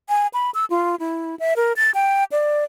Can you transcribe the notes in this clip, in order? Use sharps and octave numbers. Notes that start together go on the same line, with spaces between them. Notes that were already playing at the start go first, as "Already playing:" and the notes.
G#5
B5
E6
F4
E4
E5
A#4
A6
G5
D5